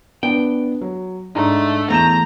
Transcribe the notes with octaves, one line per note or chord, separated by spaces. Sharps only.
B3 D4 G5
F#3
G#2 A3 D4 A#5
E2 A3 A#5 G6 E7